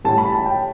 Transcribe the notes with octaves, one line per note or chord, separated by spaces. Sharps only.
A2 G3 A5
B5
A5
G5